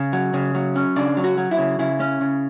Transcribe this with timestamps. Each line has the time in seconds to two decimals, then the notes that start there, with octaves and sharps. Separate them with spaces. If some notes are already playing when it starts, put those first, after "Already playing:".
Already playing: C#3
0.13 F#3
0.34 C#3
0.55 F#3
0.76 C#4
0.96 C#3 D4
1.17 F#3
1.24 F#4
1.37 F#3
1.51 E4
1.58 C#3
1.79 C#3 E4
2.00 C#4
2.21 C#3